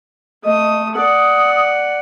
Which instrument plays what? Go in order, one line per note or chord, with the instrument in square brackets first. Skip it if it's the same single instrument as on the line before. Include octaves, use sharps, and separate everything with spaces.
[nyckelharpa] A3 D#6 [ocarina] D#5
[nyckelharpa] D5 F#5 [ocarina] D#6